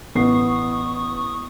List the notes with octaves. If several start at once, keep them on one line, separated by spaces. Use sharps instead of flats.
A1 B3 C#6 D#6 C7